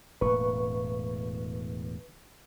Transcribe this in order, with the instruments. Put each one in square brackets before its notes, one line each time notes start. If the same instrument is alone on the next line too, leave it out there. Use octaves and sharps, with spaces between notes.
[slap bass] E1 A2 A#3 [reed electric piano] B4 C#6